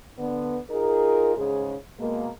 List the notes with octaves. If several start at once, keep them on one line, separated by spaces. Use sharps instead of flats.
D3 B3
D#4 F4 G#4 A#4
G#2 C#3 G#4
B2 G#3 A#3